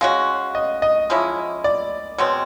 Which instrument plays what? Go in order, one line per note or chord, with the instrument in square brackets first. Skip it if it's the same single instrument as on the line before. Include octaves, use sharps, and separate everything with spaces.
[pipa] G#3 C#4 F#4 [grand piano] F5
[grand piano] D#5
D#5
[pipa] F3 G#3 C#4 E4
[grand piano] D5
[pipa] B2 G#3 C4 [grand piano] C#5